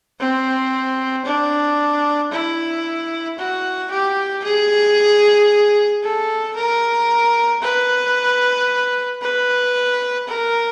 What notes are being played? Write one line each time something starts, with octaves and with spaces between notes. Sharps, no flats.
C4
D4
E4
F#4
G4
G#4
A4
A#4
B4
B4
A#4